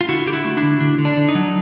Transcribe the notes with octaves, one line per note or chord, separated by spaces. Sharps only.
F4
D3 E4 F#4
D3 G4
E4 F#4
A3
D4 E4
D3
D3 D4
D3
D4
D3
D#4
F#3